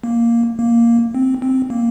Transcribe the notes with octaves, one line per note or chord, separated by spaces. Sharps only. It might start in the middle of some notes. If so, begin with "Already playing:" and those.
A#3
A#3
C4
C4
A#3